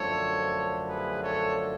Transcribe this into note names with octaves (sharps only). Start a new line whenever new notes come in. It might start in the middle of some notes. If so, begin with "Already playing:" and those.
Already playing: F#2 D3 F3 A3 A4 C#5
G#4 B4
A4 C#5